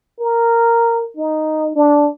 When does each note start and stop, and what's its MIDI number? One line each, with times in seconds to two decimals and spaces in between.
0.20 1.08 70
1.17 1.74 63
1.75 2.08 62